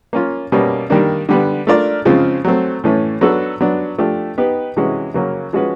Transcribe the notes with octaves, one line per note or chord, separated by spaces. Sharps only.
A#3 C#4 F4
B2 G3 A#3 C#4
D#3 G3 A#3 D4
D3 G3 B3
A3 D4 F4 A#4 D5
C#3 F3 G#3 C4 F4
F#3 A3 C4
A2 E3 A3 C#4
F#3 B3 D4 F#4 A4
F#3 B3 D4
F3 A3 D4 G4
B3 D#4 G4 B4
C3 E3 G#3 C#4 F#4
C#3 F#3 A#3 C#4
F3 G#3 C#4 F#4 B4